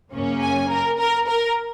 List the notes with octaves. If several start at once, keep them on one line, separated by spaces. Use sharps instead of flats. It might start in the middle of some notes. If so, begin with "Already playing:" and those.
F#2 C#3 A#3 C#4
G#5
A#4
A#4
A#4